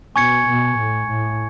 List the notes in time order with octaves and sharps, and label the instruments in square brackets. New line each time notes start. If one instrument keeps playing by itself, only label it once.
[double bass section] B2 [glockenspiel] G#5 C#6 G#6 C#7
[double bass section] B2
A2
A2